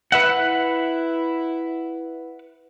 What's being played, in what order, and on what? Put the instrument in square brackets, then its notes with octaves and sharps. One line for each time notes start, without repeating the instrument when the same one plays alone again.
[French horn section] E4 [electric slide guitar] B4 E5 F#5